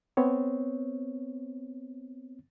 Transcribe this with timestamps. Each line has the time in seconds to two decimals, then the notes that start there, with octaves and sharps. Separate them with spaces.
0.17 B3 C4 C#5